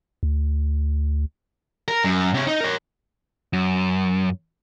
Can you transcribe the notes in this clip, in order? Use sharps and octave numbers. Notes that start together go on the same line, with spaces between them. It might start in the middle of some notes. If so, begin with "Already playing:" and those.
D2
A#4
F#2
C3 C#5
D#4
A#4 C#5
F#2